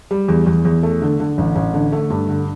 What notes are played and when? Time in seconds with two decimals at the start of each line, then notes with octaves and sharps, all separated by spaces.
0.11 G3
0.29 E2
0.46 E2
0.65 E2
0.83 A3
1.02 D3
1.20 D3
1.38 A1
1.56 A1
1.74 D3
1.92 A3
2.10 G2
2.28 D3